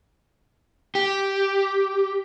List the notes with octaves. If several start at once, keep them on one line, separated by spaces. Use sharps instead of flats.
G4